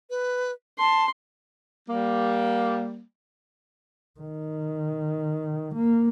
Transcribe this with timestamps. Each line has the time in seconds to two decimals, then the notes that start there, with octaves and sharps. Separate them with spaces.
0.10 B4
0.79 A5 C6
1.88 G3 A#3
4.20 D#3
5.75 A#3